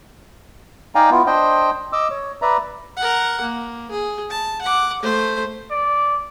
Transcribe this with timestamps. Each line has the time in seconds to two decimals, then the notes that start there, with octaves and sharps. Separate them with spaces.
0.95 D#4 D5 F5 G5 G#5 A#5
1.11 B3 E4 F4
1.27 D4 C5 D#5 G5
1.92 D#5 D6 E6
2.10 C#5
2.42 B4 D5 E5 A#5
2.97 A#4 F#5
3.41 A#3
3.91 G#4
4.31 A5
4.62 F#5 D6
5.02 A3 C5
5.70 D5